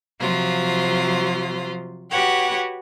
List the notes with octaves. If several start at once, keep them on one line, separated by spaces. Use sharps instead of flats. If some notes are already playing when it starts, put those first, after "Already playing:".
C3 F3 F#3 F4 C5
F#4 G4 B4 C#5 F#5 G5